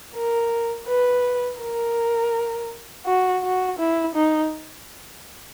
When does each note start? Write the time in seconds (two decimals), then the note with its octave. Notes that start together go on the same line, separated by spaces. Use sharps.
0.15 A#4
0.87 B4
1.60 A#4
3.06 F#4
3.43 F#4
3.79 E4
4.15 D#4